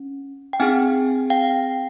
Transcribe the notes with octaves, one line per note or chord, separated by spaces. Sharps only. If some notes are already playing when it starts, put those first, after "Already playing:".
Already playing: C#4
G5
C4 D#4 G#4 F#5 G#5
F5 G5